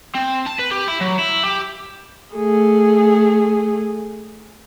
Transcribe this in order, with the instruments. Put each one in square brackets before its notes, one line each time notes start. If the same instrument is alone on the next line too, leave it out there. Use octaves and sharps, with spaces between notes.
[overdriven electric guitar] C4
A5
B4
G4
E4
F#3
E4
G4
[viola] A3 G#4